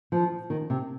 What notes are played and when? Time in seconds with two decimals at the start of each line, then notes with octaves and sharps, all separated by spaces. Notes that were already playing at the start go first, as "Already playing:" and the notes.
0.12 F3
0.50 D#3
0.70 C3